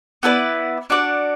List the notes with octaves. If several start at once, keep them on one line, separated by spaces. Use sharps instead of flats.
B3 E4 B4 D5
D4 F#4 D5 F#5